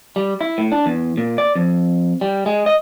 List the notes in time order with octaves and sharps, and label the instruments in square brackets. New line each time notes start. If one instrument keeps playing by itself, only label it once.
[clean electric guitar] G3
E4
A2
D4
E2
A#2
D5
F2
G3
G#3
D#5